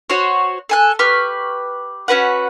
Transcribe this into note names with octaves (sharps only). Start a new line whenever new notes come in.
F#4 C5 C#5
A4 G#5 F#6
G4 B4 C#6 F6
C#4 F#4 B4 F#5